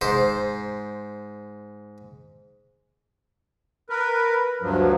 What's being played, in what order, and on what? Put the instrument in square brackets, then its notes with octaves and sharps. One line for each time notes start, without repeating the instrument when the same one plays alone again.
[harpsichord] G#2 C5
[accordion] A#4 B4
D2 G2 F3 F#3